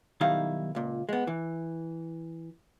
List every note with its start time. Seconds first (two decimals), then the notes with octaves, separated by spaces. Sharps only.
0.21 B1 D#3 G3 D#4 E4 F5
0.75 C#2 A#2
1.09 G#3 B3
1.27 E3